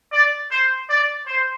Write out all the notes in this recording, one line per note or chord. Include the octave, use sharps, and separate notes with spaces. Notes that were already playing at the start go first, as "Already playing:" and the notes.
D5
C5
D5
C5